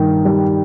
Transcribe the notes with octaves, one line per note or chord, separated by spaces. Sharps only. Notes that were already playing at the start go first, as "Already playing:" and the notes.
Already playing: G2 D#3
G3